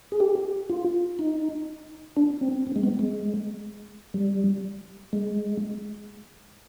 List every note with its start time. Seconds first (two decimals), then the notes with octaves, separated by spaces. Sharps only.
0.12 G#4
0.20 G4
0.70 F4
1.19 D#4
2.17 D4
2.41 C4
2.67 C4
2.76 G#3
2.83 B3
2.99 G#3
4.14 G3
5.13 G#3